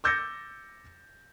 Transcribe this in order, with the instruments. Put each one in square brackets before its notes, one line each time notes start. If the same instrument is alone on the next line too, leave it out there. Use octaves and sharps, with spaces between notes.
[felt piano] D6 E6 G6 A6 A#6 C#7